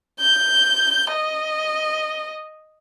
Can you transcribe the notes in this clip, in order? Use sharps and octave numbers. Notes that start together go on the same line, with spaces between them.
G6
D#5